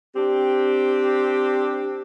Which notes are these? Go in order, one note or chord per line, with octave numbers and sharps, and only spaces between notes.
C4 D4 G4